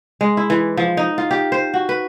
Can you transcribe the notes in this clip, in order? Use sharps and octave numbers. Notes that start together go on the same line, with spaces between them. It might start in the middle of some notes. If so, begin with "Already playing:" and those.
G#3
E4
E3
F3
D#4
F4
G4
C5
F#4
B4